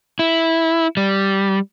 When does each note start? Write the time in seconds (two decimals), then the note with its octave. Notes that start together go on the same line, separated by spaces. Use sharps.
0.19 E4
0.97 G3